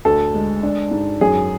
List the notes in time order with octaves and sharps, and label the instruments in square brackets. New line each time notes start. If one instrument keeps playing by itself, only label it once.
[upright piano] D2 A4
G#3
D4
G#2
F#2 G#4